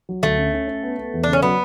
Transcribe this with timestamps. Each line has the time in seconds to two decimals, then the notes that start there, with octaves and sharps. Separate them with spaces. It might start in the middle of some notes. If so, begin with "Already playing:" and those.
0.09 F#3
0.23 D2 A3
0.38 C#4
0.53 C#4
0.67 C#4
0.83 B3
0.98 B3
1.13 E2
1.24 D4
1.28 C#3
1.33 C#4
1.42 F#3 B3